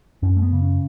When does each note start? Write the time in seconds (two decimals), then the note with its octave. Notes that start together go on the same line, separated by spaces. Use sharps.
0.22 F#2 C#4
0.37 A3
0.43 B3
0.52 C#3
0.62 C#4